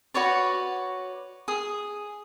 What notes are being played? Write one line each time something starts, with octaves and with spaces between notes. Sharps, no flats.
F#4 B4 C#5 D5
G#4 D#6